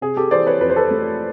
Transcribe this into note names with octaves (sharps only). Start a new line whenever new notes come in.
C3 G#4
G4 A4
E3 C5 D5
B4 C#5
F2 B4
C5
A4 B4
A3